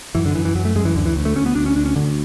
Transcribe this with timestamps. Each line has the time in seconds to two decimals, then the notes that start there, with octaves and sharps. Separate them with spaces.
0.15 F#2 E3
0.26 D3
0.35 F#2 E3
0.45 E3
0.55 F#2 F#3
0.65 A3
0.75 F#2 G#3
0.85 E3
0.95 D2 D3
1.06 E3
1.16 D2
1.25 A3
1.36 D2 C#4
1.46 B3
1.55 D2 D4
1.66 C#4
1.75 D2 D4
1.86 C#4
1.96 D2 D3